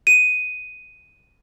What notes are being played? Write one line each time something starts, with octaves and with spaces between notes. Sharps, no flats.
D#7